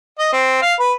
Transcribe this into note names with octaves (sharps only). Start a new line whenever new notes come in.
D#5
C4
F5
B4